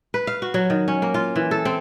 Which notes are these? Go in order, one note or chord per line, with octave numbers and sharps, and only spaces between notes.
B4
F5
F#4
F#3
D#3
C#4
A#3
F4
E3
A4
C4